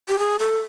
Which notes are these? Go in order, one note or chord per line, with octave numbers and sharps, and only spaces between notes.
G4
G#4
A4